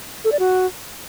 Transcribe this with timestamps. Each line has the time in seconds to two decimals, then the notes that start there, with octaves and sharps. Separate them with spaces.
0.25 A4
0.32 D5
0.39 F#4